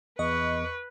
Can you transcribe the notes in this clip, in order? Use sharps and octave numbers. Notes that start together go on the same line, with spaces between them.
E2 B4 D#5 C#6